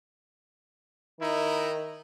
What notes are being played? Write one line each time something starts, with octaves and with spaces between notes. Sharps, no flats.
D#3 D#4 E4